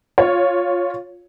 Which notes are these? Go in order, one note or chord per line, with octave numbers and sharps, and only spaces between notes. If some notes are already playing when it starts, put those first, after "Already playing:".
F4 C#5